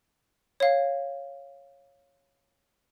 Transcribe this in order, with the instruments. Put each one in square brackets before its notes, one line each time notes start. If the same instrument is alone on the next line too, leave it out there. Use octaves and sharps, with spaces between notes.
[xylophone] C#5 F5